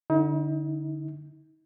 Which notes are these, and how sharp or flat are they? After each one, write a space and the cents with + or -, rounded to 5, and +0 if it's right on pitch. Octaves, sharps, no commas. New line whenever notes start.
D3 +0 D#4 +40